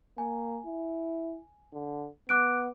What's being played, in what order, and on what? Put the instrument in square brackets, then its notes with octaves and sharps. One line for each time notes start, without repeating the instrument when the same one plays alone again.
[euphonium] A#3 [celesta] G#5
[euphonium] E4
D3
[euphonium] B3 [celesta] D6 F#6 D7